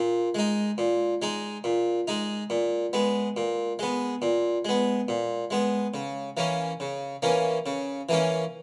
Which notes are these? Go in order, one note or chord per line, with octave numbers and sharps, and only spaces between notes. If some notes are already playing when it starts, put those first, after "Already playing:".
Already playing: A#2
G#3 D#4
A#2
G#3 D#4
A#2
G#3 D#4
A#2
G#3 B3
A#2
G#3 B3
A#2
G#3 B3
A#2
G#3 B3
C#3
E3 A#3 C#4
C#3
E3 A#3 C#4
C#3
E3 A#3 C#4